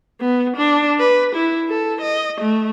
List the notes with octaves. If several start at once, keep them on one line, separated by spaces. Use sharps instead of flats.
B3
D4
B4
E4
A4
D#5
A3